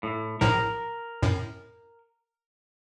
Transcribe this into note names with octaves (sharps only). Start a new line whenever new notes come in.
A2
A#1 A2 F3 A#4
F#2 A2